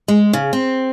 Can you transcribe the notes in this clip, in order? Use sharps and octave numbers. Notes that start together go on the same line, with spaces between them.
G#3
C#3
C4